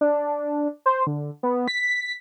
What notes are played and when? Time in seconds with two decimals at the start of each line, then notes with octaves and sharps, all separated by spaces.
0.01 D4
0.86 C5
1.07 D3
1.43 B3
1.68 B6